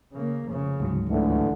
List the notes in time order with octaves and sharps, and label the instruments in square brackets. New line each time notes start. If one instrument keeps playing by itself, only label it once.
[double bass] C#3 A#3
F1 C#3
[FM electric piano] D2 G#2 F#3
[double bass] C#2 [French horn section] D3 E3 A3